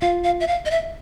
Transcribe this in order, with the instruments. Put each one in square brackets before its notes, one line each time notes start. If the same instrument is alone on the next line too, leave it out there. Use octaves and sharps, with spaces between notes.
[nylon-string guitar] F4 [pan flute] F5
[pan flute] F5
E5
F5
D#5
E5